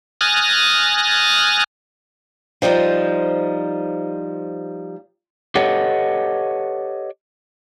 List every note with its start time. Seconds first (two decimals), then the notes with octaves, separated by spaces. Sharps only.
0.21 G#5 D#6 F6 F#6 A6 A#6
2.62 F3 G3 D#4 C5
5.55 G4 A4 B4 C#5 D#5 F#5